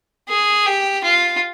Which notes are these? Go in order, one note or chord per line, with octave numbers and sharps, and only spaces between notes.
G#4
G4
F4